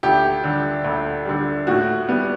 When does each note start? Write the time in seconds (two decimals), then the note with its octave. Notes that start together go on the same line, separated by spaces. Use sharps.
0.03 D2 G4
0.44 D3 G3
0.84 D2
1.25 D3 G3
1.67 A2 F#4
2.09 G3 B3